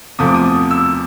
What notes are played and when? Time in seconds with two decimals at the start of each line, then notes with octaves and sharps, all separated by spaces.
0.19 E2 C3 F3 A3 D#6
0.27 D6
0.34 D#6
0.45 D#6
0.71 E6